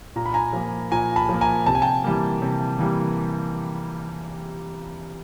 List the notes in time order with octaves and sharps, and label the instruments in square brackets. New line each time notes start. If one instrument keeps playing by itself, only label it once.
[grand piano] A#2 A#5
B5
G#5 A#5
F3 A#3
A#2 G#5 A#5
A5 B5
F3 A#3
G#5 A#5
C3 A5
G#5
G5 A5
E3 G3 A#3
C3
E3 G3 A#3